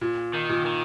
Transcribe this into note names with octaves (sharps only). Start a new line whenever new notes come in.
A#2
D#3
A#2
D#3